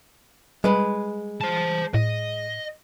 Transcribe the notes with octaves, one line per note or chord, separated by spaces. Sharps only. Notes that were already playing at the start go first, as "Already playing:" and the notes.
G3 G#3 B4
C5 A5
A2 D#5